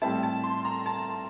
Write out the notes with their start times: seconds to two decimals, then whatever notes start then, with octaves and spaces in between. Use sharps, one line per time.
0.02 A2 G3 C4 E4 A5
0.23 A5
0.43 C6
0.65 A#5
0.86 A5